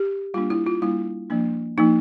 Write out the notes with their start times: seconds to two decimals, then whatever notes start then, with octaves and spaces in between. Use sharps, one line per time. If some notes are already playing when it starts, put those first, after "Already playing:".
Already playing: G4
0.34 G3 A#3 D4 F4
0.50 E4
0.66 F4
0.82 G3 A#3 D4 E4
1.30 F3 A#3 D4
1.77 F3 A#3 D4 D#4